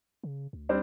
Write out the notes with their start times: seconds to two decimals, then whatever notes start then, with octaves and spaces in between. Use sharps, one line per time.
0.24 C#3
0.53 D2
0.69 G3 C4 D4